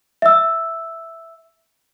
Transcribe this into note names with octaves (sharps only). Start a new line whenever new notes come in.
E5 E6